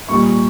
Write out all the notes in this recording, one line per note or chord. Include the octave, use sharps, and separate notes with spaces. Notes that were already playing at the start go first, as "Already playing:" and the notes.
A#2 G3 A#3 C#6